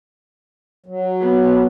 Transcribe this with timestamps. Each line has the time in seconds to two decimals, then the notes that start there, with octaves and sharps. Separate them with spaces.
0.86 F#3
1.21 B3